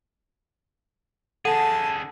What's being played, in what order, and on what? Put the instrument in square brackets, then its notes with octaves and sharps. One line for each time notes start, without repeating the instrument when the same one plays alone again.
[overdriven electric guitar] D3 G#4 [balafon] A4 [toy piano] F#5 [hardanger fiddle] A5